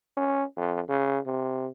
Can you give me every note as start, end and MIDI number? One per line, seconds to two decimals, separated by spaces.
0.17 0.43 61
0.57 0.80 41
0.89 1.19 49
1.26 1.67 48